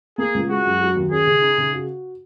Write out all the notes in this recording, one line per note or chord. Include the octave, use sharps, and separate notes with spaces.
A#3 G#4
C#2
G#3 F#4
F#2
F#3
D#2
C#4 G#4
C#3
D#4
C#3
F#4